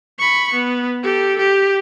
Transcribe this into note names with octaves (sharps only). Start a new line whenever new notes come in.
B5 C#6
B3
G4 A4
G4